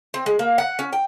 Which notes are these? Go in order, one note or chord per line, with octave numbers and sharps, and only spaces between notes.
C4
G#3
A#3
F#5
C#4
G5